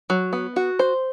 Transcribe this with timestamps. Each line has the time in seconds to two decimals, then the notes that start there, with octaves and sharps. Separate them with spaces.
0.10 F#3
0.33 B3
0.56 F#4
0.79 C5